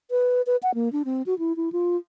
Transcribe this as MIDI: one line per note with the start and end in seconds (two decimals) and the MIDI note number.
0.11 0.42 71
0.46 0.56 71
0.63 0.74 78
0.74 0.91 58
0.93 1.03 62
1.05 1.22 60
1.26 1.38 66
1.39 1.55 64
1.57 1.72 64
1.72 1.97 65